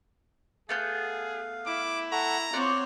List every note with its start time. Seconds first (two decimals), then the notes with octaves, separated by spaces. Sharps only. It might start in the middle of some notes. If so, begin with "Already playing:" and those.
0.69 A3 B3 G#4 F5 G6
1.66 E4 D6
2.12 A4 F#5 A#5 C#6
2.53 C4 F4 C#5 D5 F#5